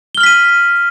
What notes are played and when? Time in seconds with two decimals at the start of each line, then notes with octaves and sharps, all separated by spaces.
0.15 G7
0.17 F6
0.20 F#7
0.23 B6
0.26 D#7